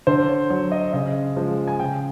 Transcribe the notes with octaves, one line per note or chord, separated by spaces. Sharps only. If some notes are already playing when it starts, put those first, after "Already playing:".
D3 C5
C#5
F#3 C#5
D#5
C#3 D#5
F3 G#3
G#5
C#3 G5